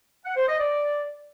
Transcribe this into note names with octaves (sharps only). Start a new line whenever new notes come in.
F#5
C5
D#5
D5